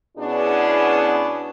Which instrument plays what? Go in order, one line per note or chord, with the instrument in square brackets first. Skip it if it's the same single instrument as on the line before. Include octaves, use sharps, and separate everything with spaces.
[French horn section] B2 B3 C#4 D4 E4 G#4